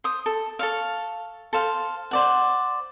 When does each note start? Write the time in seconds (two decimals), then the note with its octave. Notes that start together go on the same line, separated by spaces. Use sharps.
0.04 C5 D#6
0.26 A4
0.59 A4 C#5 F5
1.53 A4 C5 F5
2.11 C5 D5 F#5